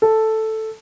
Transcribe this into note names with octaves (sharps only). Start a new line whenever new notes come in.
A4